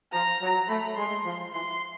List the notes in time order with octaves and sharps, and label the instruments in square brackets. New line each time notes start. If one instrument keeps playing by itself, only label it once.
[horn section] F3 [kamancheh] A#5
[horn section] F#3
[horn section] A3 [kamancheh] B5
[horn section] G#3 [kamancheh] C6
[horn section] F3
[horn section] E3 [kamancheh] C6